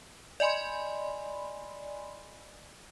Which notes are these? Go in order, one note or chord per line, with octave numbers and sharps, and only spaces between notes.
D5 D#5 G#5 B5 C6